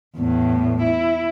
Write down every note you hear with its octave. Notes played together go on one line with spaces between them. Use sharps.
E2 A2
E4